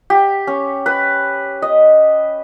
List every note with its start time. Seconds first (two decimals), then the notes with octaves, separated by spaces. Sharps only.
0.10 G4
0.47 C#4
0.86 B4
1.62 D#5